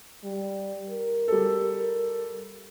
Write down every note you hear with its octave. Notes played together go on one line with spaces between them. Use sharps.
G3
A#4
G3 A4